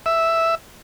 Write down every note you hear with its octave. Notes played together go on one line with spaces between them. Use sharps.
E5